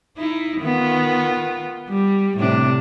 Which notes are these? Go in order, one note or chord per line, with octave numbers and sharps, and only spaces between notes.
D#4 E4
D#3 B3 F4
G3
A2 C3 D4